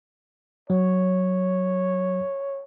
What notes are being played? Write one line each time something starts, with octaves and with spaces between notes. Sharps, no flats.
F#3 C#5